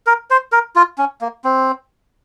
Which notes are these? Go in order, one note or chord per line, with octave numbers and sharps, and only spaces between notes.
A#4
C5
A#4
F4
C#4
A#3
C4